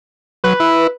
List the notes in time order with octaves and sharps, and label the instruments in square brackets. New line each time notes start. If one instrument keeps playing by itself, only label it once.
[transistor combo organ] F#3 [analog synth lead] B4
[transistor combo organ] E4